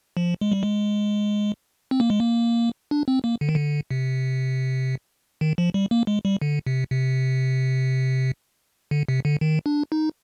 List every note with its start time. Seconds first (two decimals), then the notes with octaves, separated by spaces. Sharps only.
0.17 F3
0.41 G#3
0.52 G3
0.63 G#3
1.91 C4
2.00 A#3
2.10 G#3
2.20 A#3
2.91 D4
3.08 C4
3.24 A#3
3.41 D3
3.49 D#3
3.55 D3
3.91 C3
5.41 D#3
5.58 F3
5.74 G3
5.91 A#3
6.07 G#3
6.25 G3
6.42 D3
6.67 C3
6.91 C3
8.91 D3
9.09 C3
9.25 D3
9.41 D#3
9.66 D4
9.92 D#4